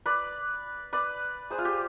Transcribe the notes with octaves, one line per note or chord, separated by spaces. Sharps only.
B4 D5
B4 D5
G#4 C5
F4
G4